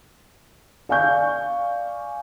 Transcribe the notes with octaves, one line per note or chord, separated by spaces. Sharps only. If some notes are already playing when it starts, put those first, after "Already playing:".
D5 F5 G#5 C#6 G6